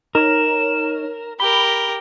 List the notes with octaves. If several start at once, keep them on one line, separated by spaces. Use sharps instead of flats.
D#4 A#4 C#5 E7
G4 A#4 B5 G7